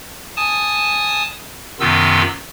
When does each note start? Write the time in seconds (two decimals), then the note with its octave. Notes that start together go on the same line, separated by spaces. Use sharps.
0.36 G#5 A5 D#6
1.80 F#2 C3 D#3 B3 F4 E6